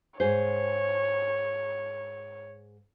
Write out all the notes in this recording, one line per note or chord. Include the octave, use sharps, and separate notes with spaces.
G#2 G#4 C5 C#5